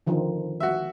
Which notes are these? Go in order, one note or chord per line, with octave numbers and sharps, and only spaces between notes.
D3 D#3 F3
F#4 E5